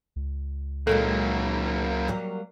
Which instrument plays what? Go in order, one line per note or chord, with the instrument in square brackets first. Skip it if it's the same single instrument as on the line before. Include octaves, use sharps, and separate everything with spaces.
[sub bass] C#2
[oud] A#2 D#3 G#3 [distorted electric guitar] F#3 A#3 [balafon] A4
[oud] F#3 G3 A#3